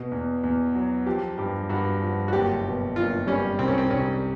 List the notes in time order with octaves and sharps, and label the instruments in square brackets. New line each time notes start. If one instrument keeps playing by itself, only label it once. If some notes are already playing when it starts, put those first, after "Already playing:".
Already playing: [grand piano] B2
E2
E2
F#3
[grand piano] F3 [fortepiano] G4
[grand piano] G2 [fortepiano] G4
[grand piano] G2 [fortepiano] F#4
[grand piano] F3
[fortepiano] F#4
[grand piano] F#1 [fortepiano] G4
[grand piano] B2
[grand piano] F#1 [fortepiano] F4
[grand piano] G3 [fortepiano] C#4
[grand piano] C2 [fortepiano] C4
[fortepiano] C#4
C4
[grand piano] C2 [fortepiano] C#4